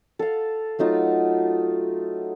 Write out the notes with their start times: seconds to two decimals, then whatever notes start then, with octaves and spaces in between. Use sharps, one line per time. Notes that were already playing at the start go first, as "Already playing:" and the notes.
0.19 A4 F5
0.79 F#3 A3 D#4 F4